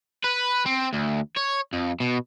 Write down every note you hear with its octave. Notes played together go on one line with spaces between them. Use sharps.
B4
C4
D2
C#5
F2
B2